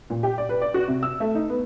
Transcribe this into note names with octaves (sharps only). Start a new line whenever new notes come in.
A#2
G4
D5
B4
D5
F#4
C3
E6
A3
D#4
B3